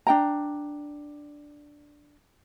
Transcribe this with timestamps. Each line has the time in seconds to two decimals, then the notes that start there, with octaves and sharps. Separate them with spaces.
0.07 D4 G5 A#5